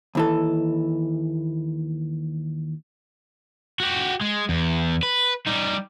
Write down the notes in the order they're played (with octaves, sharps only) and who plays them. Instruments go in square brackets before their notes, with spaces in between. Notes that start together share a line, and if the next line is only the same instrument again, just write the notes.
[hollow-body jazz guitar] D#2 E3 A4
[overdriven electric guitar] F#4 G4
G#3
E2
B4
G3 D#4